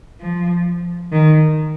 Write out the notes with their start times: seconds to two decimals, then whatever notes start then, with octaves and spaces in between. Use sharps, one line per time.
0.20 F3
1.12 D#3